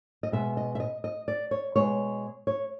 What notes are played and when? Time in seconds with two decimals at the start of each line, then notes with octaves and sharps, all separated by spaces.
0.23 D#5
0.32 B2 G#3 B3 E5
0.57 D#5
0.75 E5
0.80 D#5
1.04 D#5
1.28 D5
1.51 C#5
1.76 B2 G#3 B3 C#5
2.47 C#5